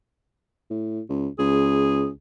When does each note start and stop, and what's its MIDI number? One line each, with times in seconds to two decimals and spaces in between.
0.70 1.01 45
1.09 1.28 37
1.39 2.10 37
1.39 2.09 68